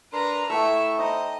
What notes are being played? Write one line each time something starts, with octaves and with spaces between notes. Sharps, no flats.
D4 A#4 B4 A#5 C6
A3 E4 E5 G5 C#6
D#4 C5 D#5 A#5